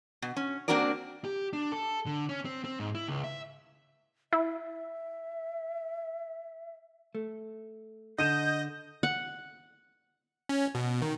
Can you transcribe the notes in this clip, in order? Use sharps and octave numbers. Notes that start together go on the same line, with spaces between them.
B2
C#4
A#3 C4 D4 F#4 A#4 D5
G4
D4
A4
D3
C#4
C4
C4
G#2
E4
C#2
E5
E4 E5
A3
D3 D#5 G6 D#7 E7
F#5
C#4
B2
D#3